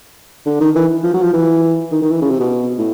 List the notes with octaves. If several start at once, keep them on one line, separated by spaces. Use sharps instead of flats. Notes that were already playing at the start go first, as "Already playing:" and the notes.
D3
D#3
E3
F3
F#3
F3
E3
D#3
D#3
E3
C#3
C3
B2
A2